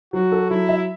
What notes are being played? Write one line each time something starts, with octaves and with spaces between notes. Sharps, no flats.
F#3 F#4
A4
F#3 E4
E5